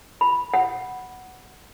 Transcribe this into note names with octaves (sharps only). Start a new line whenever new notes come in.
B5
F#5